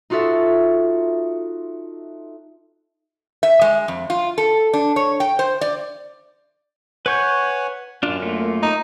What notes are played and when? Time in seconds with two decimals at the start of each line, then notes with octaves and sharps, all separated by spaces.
0.10 D#4 F4 F#4 A4 E5
3.43 E5
3.61 G#3
3.88 F2
4.10 F4
4.38 A4
4.74 D4
4.96 C#5
5.20 G5
5.39 C5
5.61 D5
7.06 B4 C#5 F#5 G#5 C#6 G6
8.03 F#2 D4 F4
8.22 A3 A#3 F4
8.62 D#4